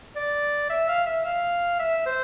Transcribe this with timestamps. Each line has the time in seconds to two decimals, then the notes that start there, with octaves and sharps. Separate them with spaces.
0.16 D5
0.70 E5
0.89 F5
1.06 E5
1.25 F5
1.79 E5
2.06 C5